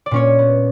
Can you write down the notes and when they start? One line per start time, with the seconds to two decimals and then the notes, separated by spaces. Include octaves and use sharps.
0.06 D5
0.11 A#2 C#4 C#5
0.39 B3